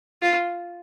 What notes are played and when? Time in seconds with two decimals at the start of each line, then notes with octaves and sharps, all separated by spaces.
0.22 F4